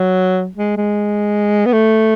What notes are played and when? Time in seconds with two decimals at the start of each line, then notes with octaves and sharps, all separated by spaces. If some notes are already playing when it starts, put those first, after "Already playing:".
Already playing: F#3
0.57 G#3
0.77 G#3
1.66 B3
1.73 A3